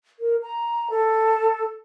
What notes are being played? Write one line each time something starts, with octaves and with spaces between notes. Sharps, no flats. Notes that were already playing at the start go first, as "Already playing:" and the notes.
A#4
A#5
A4